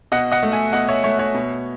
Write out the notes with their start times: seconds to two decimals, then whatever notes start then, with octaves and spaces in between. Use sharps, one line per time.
0.12 B2 D#5 F#5
0.32 D#5 F#5
0.43 A3
0.52 E5 G#5
0.73 B2 D#5 F#5
0.88 C#5 E5
1.04 A3 C#5 E5
1.19 C#5 E5
1.34 B2